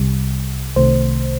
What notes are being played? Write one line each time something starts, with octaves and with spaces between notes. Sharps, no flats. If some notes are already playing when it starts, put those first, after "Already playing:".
Already playing: C2 C3 G3
C2 C3 D#3 A3 C5